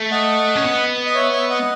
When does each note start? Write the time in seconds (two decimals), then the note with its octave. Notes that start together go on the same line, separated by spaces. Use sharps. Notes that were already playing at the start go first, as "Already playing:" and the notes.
Already playing: A3
0.11 D#5 F#5
0.55 C#4
0.62 B3
1.06 D#5
1.15 C#5 E5
1.33 C#5 E5
1.50 D#5 F#5